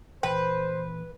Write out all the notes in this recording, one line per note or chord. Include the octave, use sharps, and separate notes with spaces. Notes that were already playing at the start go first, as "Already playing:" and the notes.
A#2 E3 B4 C5 G5